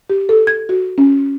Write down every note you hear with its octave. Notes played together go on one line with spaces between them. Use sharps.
G4
A4
G#6
F#4
C#4